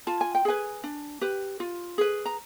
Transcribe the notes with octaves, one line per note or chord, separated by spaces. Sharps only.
F4 A5
G#5
G5
G#4 B4 G#5
D4
G4 B4
F4
G#4 B4
A#5